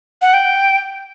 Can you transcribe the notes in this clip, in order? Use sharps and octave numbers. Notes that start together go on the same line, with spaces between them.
F#5
G5